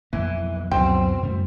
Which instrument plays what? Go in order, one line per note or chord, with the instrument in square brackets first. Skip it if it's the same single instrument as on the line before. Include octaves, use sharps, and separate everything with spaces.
[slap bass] B1 F2 A#3 [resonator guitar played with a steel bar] E3
[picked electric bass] C#2 F#2 F#3 [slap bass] B2 E3 [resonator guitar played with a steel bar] C4 [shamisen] G5
[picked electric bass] F#2 [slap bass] C#3 G3 A3